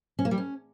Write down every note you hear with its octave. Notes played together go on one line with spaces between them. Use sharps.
C#4
A#3
G3
C#4